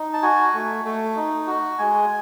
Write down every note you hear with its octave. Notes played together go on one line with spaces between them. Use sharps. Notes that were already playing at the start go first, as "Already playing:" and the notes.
Already playing: D#4
A5
F#4 G#5
A3
A3
D#4
F#4
G#3 G#5